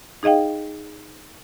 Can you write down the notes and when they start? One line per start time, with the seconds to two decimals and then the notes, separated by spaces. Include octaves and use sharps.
0.23 D#4 G#4 D#5 F5 G5